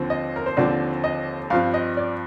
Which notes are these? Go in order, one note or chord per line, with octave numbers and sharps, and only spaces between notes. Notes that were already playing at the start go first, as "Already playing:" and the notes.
Already playing: D#2 D3 F3 C4
D#5
A#4
C5
D#2 D3 F3 C4 D5
D#5
G2 F3 C4 F5
D#5
D5